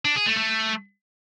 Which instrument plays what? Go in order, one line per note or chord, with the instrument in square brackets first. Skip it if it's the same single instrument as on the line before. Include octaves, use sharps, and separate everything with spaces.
[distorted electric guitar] D4
G#4
A3
A3